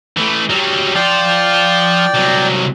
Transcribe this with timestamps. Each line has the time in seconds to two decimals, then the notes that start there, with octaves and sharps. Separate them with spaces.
0.17 E3 A3
0.50 F#3 G3
0.95 F3 F4 D5 G5
2.14 C2 F#3